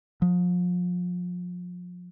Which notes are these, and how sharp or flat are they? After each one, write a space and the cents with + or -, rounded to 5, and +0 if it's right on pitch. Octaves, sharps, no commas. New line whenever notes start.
F3 +35